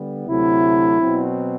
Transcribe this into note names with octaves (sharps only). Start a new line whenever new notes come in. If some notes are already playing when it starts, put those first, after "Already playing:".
Already playing: D3 G3 B3
D2 C3 F#3 A3 E4
B2 F#3 C4